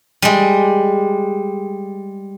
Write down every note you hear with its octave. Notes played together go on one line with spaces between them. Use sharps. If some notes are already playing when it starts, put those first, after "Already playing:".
G3 G#3